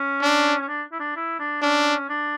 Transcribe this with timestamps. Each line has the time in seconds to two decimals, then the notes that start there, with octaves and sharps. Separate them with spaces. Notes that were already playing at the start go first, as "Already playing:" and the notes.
Already playing: C#4
0.22 D4
0.61 C#4
0.69 D4
0.92 E4
1.00 D4
1.16 E4
1.40 D4
1.62 C#4 D4
2.09 D4